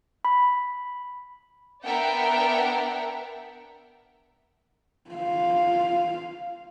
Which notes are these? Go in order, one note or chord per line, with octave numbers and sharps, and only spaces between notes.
B5
B3 D4 A#4 E5 F#5 G5
F4 F5